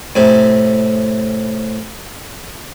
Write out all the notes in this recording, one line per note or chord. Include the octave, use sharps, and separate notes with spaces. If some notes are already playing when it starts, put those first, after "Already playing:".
A2 C3